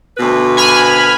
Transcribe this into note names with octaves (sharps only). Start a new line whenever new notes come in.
D2 B2 B4
G#5 B5 F6